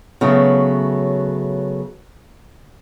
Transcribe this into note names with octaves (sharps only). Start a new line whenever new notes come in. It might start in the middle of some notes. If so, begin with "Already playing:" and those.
C#3 F#3 A3 B3